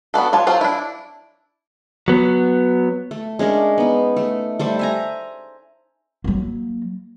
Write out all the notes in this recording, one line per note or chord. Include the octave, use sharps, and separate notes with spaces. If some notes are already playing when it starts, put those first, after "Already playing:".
B3 D4 F#4 A4
F4 C#5 A5
F#3 C4 F4
D4 E4
F#3 B3
A3
G#3 C#4 D4 A#4
B3 D#4
A3
G3 A3 C5
E5 G#5 A#5
F#3 A#3